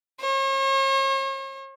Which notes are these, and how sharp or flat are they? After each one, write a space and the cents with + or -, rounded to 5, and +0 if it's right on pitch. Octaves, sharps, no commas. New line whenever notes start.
C#5 -40